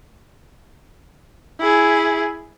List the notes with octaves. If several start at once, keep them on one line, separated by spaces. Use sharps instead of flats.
E4 G#4